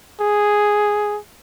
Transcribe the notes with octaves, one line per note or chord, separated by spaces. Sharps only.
G#4